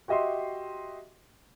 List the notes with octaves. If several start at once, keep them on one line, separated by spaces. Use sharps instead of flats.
F#4 G4 D#5 E5 C6